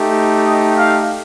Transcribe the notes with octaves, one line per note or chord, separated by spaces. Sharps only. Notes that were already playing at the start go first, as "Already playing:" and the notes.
Already playing: A3 D#4 G4
D#5
F5